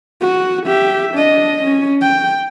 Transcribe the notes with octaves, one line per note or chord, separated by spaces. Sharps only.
F#4
G4 E5
D4 D#5
C#4
G5